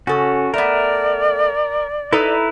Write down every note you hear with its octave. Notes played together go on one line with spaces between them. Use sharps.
C#3 C#4 F#4 A4
A3 B3 A#4 D5
D#4 E4 A4 B4 A#5